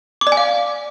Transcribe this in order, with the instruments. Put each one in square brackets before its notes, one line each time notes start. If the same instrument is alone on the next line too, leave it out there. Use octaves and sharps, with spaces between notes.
[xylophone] D6
D5
G#5
F5